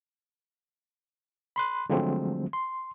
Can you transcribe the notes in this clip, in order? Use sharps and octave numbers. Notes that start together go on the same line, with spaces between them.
B5 C6 F#6
D3 F3 F#3 G#3 A3 C4
C6